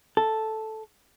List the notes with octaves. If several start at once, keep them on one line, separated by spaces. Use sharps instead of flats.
A4